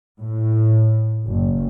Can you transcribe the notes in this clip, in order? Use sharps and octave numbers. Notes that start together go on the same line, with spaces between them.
A2
F#1